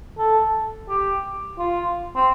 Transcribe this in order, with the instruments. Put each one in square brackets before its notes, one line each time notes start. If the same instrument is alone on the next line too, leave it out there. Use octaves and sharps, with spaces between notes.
[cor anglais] A4
G4
F4
C4